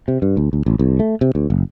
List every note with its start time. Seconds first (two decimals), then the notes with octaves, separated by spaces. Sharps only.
0.08 C3
0.22 G2
0.37 D2
0.53 D2
0.66 A1
0.79 C2
1.00 A3
1.21 C3
1.35 D2
1.50 F#1